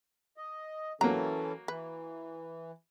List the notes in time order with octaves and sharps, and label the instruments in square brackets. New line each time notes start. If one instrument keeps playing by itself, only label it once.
[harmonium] D#5
[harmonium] E3 C#4 A4 [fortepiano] F#3 A#3 [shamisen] A#5
[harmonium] E3 [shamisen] B4